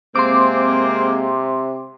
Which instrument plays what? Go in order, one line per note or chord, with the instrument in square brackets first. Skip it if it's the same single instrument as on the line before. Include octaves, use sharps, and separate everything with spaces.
[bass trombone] C3 [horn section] G#3 A#3 C4 [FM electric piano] C6 D6